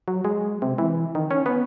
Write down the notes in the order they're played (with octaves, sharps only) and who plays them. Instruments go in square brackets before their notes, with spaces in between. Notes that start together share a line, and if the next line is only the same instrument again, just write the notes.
[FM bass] F#3
G#3
C3
E3
D#3
C#4
B3